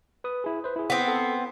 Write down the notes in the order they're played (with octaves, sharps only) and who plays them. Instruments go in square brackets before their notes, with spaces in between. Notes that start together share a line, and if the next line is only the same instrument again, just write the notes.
[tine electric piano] B4 D#6
E4 G#4
B4 C5
E4 G#4
[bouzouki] B3 C4
[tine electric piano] A4